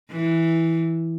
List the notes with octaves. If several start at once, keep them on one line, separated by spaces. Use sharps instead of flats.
E3